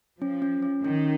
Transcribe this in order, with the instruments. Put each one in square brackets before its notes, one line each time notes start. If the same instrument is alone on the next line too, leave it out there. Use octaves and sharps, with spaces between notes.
[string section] F3 [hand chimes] C#4
[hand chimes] C#4
C#4
[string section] D#3 [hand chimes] C#4